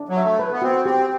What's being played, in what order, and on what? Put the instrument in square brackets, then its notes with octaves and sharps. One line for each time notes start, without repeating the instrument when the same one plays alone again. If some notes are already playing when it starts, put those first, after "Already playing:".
Already playing: [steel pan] D4
[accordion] F#3
[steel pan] E5
[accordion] A3
[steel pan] B4
[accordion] B3
[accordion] C4 [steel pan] F#4
[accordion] C4 [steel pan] G4